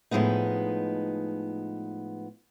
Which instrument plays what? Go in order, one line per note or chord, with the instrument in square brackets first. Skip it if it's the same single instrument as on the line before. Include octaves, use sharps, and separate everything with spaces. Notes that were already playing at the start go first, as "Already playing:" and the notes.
[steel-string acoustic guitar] A2 F3 G#3 B3 D#4